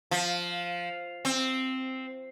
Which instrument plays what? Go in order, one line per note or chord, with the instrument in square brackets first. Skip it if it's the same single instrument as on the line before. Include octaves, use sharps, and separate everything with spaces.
[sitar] F3
C4